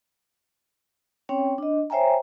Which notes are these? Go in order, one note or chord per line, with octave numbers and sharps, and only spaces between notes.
C4 C#4 C#5 G5
D4 D#5
C5 C#5 E5 G5 G#5 A#5